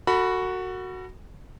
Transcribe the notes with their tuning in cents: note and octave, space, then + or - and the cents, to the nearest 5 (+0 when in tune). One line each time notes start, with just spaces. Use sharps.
F#4 +0 A4 +40 B5 +0